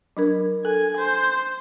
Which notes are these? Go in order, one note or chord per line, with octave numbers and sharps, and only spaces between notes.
F#3 D4 A#4
A4 G#5
C5